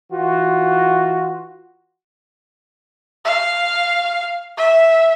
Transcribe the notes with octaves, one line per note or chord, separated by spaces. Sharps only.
E3 F4 F#4
F5
E5